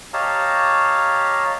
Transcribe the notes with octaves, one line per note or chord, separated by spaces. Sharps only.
G4 C#5 D#5 F5 A5 A#5